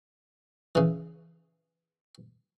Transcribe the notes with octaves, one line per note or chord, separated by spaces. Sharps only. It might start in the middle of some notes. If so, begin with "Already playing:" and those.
C#3 E3